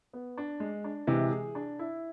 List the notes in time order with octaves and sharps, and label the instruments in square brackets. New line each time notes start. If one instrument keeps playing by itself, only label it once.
[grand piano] B3
D4
G#3
D4
[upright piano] C3 E3 [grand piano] G#3
[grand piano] G#4
D4
E4